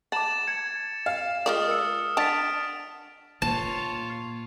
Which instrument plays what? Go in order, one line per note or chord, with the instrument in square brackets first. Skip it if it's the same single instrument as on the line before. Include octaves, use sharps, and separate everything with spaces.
[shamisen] F#5 [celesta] A5 A#5 D6 [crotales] A6 E7
[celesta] G#6 [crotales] C#7
[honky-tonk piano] F5
[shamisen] G#3 F4 D5 [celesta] A#4 F#7 [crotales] D#6 F6
[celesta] A#4 E6 C#7
[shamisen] D4 A5 [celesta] F#5 A6 B6 [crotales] D7 F7
[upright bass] A#2 [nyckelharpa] F4 C#5 [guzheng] A5